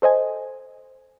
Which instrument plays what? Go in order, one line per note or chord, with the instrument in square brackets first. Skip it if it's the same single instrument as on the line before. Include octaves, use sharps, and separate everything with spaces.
[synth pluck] A4 C5 D#5 G#5